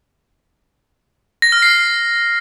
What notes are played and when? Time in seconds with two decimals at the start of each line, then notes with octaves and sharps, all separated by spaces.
1.42 A#6
1.52 F6
1.62 C7